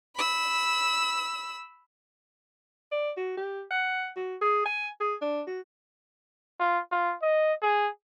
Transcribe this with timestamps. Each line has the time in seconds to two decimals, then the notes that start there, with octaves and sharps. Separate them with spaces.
0.16 B5 E6
2.92 D5
3.17 F#4
3.38 G4
3.71 F#5
4.16 F#4
4.42 G#4
4.66 G#5
5.00 G#4
5.21 D4
5.47 F#4
6.60 F4
6.92 F4
7.22 D#5
7.62 G#4